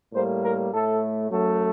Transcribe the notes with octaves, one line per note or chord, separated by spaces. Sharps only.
A2 G3 A#3 C5
A#4
A2 A3 A4
F#2 F#3 A3